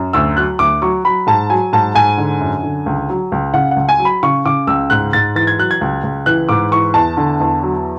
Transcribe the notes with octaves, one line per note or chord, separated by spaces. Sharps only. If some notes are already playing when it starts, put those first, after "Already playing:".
Already playing: F#2
D2 E6
F#3 F#6
D2 D6
F#3 C#6
F#3 B5
G#2 A5
F#3 G#5
G#2 A5
G#2 G#5
D3
F#2
D3
C#2
F#3
C#2
C#3 F#5
C#2 F#5
G#5
F#3
B5
C#3 C#6
C#3 D6
C#2 E6
G#2 F#6
G#2 A6
E3 A6
G#6
F#3 F#6
G#6
C#2
C#2
E3 F#6
G#2 D6
E3 C#6
E2 A5
D3
E2
F#3